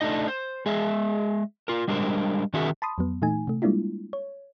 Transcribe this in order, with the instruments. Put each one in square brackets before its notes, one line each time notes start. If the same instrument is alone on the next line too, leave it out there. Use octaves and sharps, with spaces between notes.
[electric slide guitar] A3 D4 D#4 D#5
C5
G#3 G#4 D#5 E5
F4 A#4
G3 G#3 D4 A#4 C5
D#3 C#4 F#4 G#4 A#4 E5
[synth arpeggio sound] A5 B5 C6 D#6
F2 F#3 B3
A#2 E3 A3 D#4 G#5
C3 A3
G3 G#3 A#3 D4 E4 F4
C#5